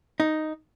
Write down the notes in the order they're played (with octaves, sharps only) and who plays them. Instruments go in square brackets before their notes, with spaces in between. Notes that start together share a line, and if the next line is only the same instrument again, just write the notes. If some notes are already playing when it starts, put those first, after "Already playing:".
[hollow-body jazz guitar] D#4